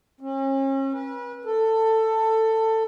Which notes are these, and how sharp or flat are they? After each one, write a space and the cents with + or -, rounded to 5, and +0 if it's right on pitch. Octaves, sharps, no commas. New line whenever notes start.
C#4 -40
B4 -35
A4 +15